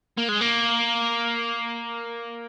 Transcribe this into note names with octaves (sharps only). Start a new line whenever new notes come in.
A#3
G#3
A#3